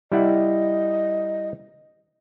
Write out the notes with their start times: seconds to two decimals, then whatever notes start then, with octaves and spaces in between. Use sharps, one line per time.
0.12 G3 E4 D#5 F#5